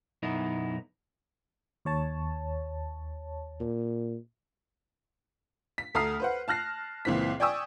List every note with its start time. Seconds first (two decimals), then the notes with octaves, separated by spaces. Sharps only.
0.23 B1 F#2 B3 D#4 E4
1.85 D#2 C#5 A5
3.60 A#2
5.78 B6
5.95 D2 A4 A#5 D#6 F6 C7
6.20 B4 C5 F#5
6.48 A5 F6 F#6 A#6 C7
7.05 C#2 A#2 E3 C4 B6
7.40 D5 G5 G#5 C#6 D#6 E6